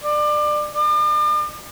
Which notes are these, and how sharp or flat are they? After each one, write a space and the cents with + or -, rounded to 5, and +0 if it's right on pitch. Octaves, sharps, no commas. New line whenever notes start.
D5 +25
D5 +45